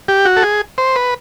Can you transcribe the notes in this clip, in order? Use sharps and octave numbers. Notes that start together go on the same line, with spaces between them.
G4
F#4
A4
G#4
C5
B4